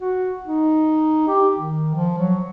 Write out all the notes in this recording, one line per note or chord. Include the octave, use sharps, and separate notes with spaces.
F#4
D#4
G4
D#3
F3
F#3